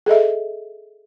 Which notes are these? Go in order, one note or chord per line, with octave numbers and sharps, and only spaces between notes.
G#4 A4 D#5 E5